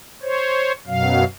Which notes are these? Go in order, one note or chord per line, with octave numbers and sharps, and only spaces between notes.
C5 C#5
F#2 B2 F#3 F5